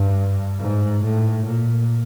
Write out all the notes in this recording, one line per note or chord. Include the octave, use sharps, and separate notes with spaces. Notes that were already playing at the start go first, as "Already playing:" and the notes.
Already playing: G2
G#2
A2
A#2